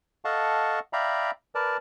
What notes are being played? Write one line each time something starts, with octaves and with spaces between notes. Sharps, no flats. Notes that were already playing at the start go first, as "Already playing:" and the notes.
A4 D#5 F5 F#5 A5 C#6
D5 E5 F5 G5 A#5 B5
A#4 B4 D5 A5